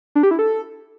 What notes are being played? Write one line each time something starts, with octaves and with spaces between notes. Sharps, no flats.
D4
G4
E4
A4